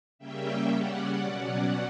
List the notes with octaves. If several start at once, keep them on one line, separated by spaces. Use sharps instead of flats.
C#3 G3 A#3 C#4 E5 G5
C#3 G3 C#4 D5 F#5
B2 F#3 C#4 D5 F#5